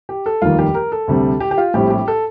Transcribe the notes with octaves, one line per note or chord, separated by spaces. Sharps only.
G4
A4
F1 D#2 D#3 G3 A#3 F4
G4
A#4
A4
D2 C3 G3 C4
G4
G4
F4
A#1 A2 G3 C4 G4
G4
A4